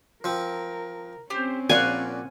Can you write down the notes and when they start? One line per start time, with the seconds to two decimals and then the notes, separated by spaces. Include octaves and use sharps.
0.24 F3 C4 A#4
1.30 C4 C#4 G4 C5
1.70 A#1 A#2 D5 F5 F#5 G#5 F#6